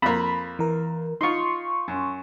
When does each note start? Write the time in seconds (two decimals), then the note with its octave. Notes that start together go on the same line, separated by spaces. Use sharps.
0.02 F2 A#3 B5
0.59 E3 A#4
1.21 D#4 F4 C6 C#6
1.88 F#2